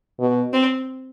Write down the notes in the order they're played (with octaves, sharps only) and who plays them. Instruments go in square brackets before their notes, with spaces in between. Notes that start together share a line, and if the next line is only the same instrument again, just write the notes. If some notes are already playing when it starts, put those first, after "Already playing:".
[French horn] B2
[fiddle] C4